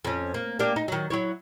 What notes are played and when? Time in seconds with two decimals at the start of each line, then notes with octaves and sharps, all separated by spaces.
0.05 F2 C#4
0.34 A#3
0.59 A#3 D4 G4
0.76 D#4
0.88 D#3 F#3
1.10 F#3 E4 C#5